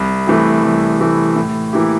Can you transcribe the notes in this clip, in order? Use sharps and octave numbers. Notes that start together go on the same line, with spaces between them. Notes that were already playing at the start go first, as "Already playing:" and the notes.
Already playing: C2
C3 E3 A3
C2
C3 E3 A3
A2
E3 A#3 E4 G4